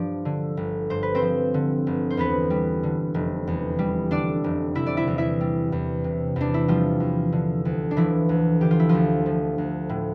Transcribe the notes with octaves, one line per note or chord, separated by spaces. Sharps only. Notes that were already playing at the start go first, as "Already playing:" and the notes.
Already playing: G2 F3 D4 D5
D3
G1
G2 C5
B4
C4 C5
F3
D3
G1
C5
E2 B3 B4
G3
D3
F1
E2
G3
D3 D4 D5
F1
C3 E4 E5
D5
E4 E5
E2
E4 E5
G3
E2
C3
E2 D4
E4
F3 G3 F4
E2
D3
D2
D4
E3 F3 E4
D2
D3 G4
F4
E4
D2 F3 F4
F3
D2
A2